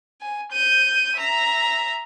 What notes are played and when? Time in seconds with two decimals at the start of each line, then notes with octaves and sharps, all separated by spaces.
0.21 G#5
0.52 G6 D#7
1.17 E5 A#5